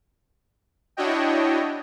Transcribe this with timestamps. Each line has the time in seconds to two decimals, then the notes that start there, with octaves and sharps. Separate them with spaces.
0.97 D4 E4 F#4 C#5 D#5 G5